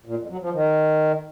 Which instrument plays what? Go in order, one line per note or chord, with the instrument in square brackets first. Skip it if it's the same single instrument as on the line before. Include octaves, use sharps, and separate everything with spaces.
[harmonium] A#2
F2
F#3
F3
D#3